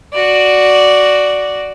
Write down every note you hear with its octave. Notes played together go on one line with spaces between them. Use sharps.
F#4 D5